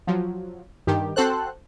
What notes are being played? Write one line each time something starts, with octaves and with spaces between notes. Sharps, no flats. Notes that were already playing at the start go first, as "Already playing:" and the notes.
F3 F#3
G2 D#3 G4
C4 F#4 A4 C5 F#6